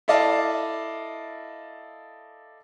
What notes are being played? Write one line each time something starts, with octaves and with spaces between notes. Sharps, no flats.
E4 A4 D5 D#5 F5 A5